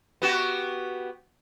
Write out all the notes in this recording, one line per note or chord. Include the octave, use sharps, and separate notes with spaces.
B3 F#4 G4